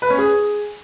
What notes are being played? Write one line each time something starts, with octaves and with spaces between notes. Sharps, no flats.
B4
C#4
G#4